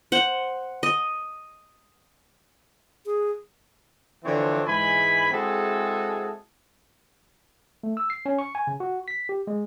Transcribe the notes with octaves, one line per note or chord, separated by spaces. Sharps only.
C5 F#5
D#5
G#4
D3 E3 F3 C4 D4 C#5
G#2 E3 G#3 G#5 B5
G#3 C4 E4 F#4 G#4 A4
A3
E6
C7
C#4
C#6
G#5
C#3
F#4
B6
G4
G#3